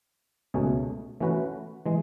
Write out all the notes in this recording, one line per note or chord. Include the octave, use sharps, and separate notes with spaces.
C#2 B2 A3 C#4 G#4
E3 A3 C#4 F#4 B4
E3 G#3